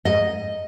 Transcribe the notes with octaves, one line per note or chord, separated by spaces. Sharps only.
G#2 D#5